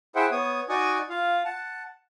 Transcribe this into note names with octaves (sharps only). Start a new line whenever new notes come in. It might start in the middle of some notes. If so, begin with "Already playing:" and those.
E4 G#4 C5 E5 F#5 G5
B3 C#5 D#6
D#4 F#4 D5 G#5 C#6 D#6
F4 F5
F#5 A5